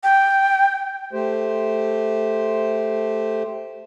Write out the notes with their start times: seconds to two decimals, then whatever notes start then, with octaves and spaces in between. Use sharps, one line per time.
0.03 G5
1.13 A3 G4 C5